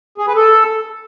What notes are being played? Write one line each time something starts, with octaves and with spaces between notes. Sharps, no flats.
G#4
B4
A4